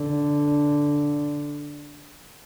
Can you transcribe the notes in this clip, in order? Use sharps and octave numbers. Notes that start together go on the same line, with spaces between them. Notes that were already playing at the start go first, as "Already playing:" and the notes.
Already playing: D3